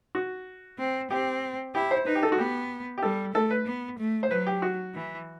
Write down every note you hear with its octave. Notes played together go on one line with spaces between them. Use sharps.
F#4
C4
C4 G4
E4 G4
C5
D#4 B4
G4
A4
F#4
B3 G4
G4
G3 A4
A3 A4
B4
B3
A3
C5
F#3 B4
G4
F#4
E3